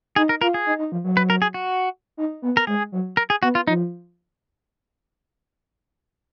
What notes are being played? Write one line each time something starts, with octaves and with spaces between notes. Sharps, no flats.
D#4 G#4
A#4
F4 A#4
G#4
D#4
D#4
F3
F#3
B4
A#4
G#4
F#4
D#4
B3
A#4
G#3 G#4
F#3
A#4
G#4
B3 F#4
F4
F3 D#4